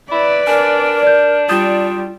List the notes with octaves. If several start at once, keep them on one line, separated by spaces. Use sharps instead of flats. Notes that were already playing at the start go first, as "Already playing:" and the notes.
E4 B4 D5
D4 A#4 G#5
D5 G6
G3 F4 D#6 G6 E7